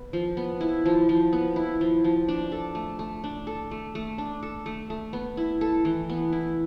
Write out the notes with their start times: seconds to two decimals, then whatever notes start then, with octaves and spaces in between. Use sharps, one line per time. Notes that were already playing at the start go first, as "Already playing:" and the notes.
Already playing: B3
0.13 F3
0.37 B3
0.61 E4
0.86 F3
1.09 F3
1.33 B3
1.56 E4
1.81 F3
2.04 F3
2.28 D4
2.52 A4
2.75 A3
2.99 A3
3.24 D4
3.47 A4
3.71 A3
3.95 A3
4.18 D4
4.43 A4
4.66 A3
4.90 A3
5.13 B3
5.37 E4
5.61 A4
5.85 E3
6.09 B3
6.32 E4